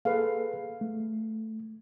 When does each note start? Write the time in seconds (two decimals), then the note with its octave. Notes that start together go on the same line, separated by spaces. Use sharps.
0.05 A#3 G#4 A4 B4 F5
0.81 A3